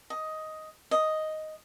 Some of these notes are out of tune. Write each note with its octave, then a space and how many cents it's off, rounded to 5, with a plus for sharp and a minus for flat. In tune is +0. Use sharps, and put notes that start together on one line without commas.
D#5 +10
D#5 +5